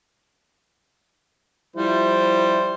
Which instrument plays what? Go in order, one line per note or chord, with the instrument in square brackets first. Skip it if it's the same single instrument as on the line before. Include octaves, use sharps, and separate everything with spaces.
[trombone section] F3 E4 [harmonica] G3 C5